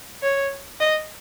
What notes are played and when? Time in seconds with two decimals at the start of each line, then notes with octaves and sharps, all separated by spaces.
0.22 C#5
0.80 D#5